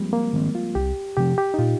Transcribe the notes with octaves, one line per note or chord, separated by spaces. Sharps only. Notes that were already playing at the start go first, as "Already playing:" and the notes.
Already playing: F3 G3 G#3 A#3 C4
A#3
D#3 G#3 C4
F4
C2 G4
C3 F3 C4 G4
G4
D#4
A#2 F4